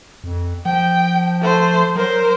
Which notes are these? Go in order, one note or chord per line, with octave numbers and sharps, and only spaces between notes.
F2
F3 G5
A3 C5
F#3 A#4 C5